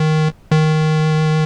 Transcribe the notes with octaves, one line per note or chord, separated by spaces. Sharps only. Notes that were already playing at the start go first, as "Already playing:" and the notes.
Already playing: D#3
D#3